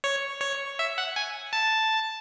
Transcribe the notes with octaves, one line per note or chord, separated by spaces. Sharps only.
C#5
C#5
E5
F#5
G#5
A5